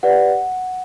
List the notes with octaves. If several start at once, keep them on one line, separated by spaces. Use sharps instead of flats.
G4 B4 D5 F#5